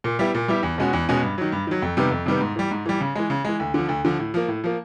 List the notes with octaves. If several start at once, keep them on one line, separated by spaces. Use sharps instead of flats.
A#2
G3 B3 E4 G4
A#2
G3 B3 E4 G4
E2
B2 G#3 C#4 F#4
E2
B2 G#3 C#4 F#4
G2
D#3 F#3
G2
D#3 F#3
F2
C3 D#3 G3 B3
F2
C3 D#3 G3 B3
G#2
E3 G3
G#2
E3 G3
C#3
E3 G#3
C#3
E3 G#3
D2
D3 F3
D2
D3 F3
A2
F3 A#3
A2
F3 A#3